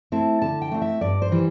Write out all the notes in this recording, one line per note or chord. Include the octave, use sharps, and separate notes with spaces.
A3 C4 E4
D3 A5
G5
A3 C4 E4
E5
G2 D5
C5
E3 G3